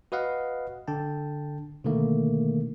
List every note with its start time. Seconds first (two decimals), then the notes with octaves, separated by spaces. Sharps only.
0.12 F#4 B4 D#5 F5 F#5
0.88 D3 G5 A5
1.84 B2 D3 D#3 A3 A#3